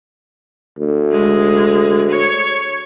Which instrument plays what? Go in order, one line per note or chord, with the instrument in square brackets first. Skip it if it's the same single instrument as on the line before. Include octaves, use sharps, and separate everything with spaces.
[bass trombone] D2
[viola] G#3
C#5